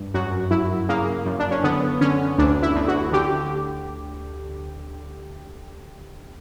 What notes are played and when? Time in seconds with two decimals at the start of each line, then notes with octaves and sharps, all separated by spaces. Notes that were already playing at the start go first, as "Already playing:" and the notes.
Already playing: G2
0.14 F#2 F#4
0.51 F#2 E4
0.89 C#3 A#3
1.26 F#2
1.39 D4
1.51 C#4
1.64 D3 B3
2.01 D3 C#4
2.38 D2 D4
2.62 E4
2.75 D2
2.88 F#4
3.12 D3 G4